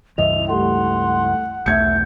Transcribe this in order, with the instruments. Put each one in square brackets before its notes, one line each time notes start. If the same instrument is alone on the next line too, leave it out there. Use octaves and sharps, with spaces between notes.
[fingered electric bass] C#2 G2 E3 [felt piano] D#5 E5 [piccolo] F7
[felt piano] G3 A3 [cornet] F#5 [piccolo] C6
[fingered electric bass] B1 E2 A3 [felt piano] E5 G#6 C#7 [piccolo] G6